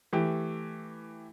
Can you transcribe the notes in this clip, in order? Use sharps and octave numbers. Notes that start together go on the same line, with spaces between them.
E3 A3 G4